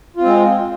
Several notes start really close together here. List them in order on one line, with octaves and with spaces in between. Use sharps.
F4 C4 G#3